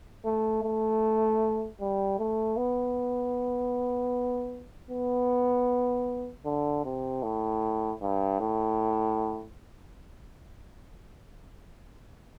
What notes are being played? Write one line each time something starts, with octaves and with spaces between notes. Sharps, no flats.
A3
A3
G3
A3
B3
B3
D3
C3
A2
G2
A2